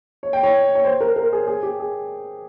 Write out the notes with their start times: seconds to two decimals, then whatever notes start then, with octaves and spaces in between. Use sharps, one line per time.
0.23 C#5
0.33 G5
0.43 C#5
0.75 C#5
0.85 C5
1.01 A#4
1.16 A#4
1.33 G#4
1.47 G#4
1.63 G4
1.80 G#4